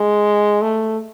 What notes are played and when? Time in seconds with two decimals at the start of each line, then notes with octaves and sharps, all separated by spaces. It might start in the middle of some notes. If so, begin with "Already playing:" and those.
Already playing: G#3
0.62 A3